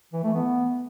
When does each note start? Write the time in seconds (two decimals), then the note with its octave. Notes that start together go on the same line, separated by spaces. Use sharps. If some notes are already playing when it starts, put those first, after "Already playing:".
0.13 E3
0.23 A3
0.34 B3